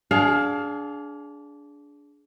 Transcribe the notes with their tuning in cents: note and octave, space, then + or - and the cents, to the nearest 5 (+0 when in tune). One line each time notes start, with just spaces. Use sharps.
D4 -20 G#4 +15 F5 +15